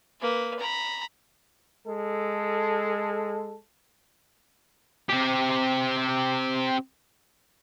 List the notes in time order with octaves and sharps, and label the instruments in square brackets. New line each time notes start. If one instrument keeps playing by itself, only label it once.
[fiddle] A#3 B4
A#5 B5
[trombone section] G#3 A4
[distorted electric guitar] C4 G4